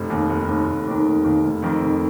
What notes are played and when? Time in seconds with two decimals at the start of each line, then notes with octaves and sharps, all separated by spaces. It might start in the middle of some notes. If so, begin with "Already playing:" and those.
Already playing: F1
0.10 D#2 D#3
0.29 F1
0.48 D#2 D#3
0.67 F1
0.87 D#2 D#3
1.06 F1
1.24 D#2 D#3
1.44 F1
1.62 F2 D#3
1.82 F1